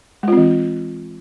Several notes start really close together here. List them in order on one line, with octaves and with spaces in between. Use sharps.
G#3 F4 C4 E3